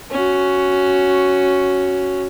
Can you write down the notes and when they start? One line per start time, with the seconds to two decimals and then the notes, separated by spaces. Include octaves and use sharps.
0.11 C#4 F#4